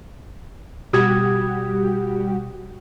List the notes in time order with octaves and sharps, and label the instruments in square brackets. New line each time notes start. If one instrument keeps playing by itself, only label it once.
[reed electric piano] B2 D#6 G#6 [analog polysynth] G3 F#4 G4